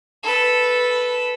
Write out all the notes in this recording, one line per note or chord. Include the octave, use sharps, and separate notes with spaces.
A4 B4